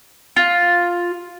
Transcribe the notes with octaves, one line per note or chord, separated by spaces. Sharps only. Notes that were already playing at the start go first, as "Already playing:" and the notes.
F4